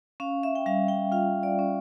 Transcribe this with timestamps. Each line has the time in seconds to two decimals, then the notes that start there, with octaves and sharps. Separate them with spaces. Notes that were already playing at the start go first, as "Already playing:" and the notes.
0.20 C#4 F5
0.43 E5
0.55 G5
0.66 G3 F5
0.88 G5
1.12 F4 F5
1.43 D5
1.59 C#4